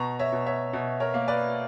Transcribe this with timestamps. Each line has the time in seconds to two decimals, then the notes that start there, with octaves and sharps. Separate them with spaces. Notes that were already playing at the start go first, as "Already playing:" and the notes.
Already playing: B2 A#5 C#6
0.19 C#5 E5
0.33 B2
0.46 C#5 E5
0.73 B2
1.00 A#4 C#5
1.14 A#3
1.28 B4 D5